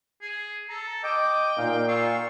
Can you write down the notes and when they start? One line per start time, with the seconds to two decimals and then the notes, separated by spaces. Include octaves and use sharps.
0.21 G#4
0.69 A4 A#5
1.04 D#5 G5 D6
1.58 A#2 D#4 F5
1.88 F4 C#6 E6